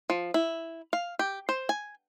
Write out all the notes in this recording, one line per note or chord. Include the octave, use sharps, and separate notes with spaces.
F3
E4
F5
G4
C5
G#5